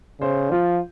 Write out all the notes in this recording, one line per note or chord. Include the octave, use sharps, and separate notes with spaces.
C#3 C5
F3 F4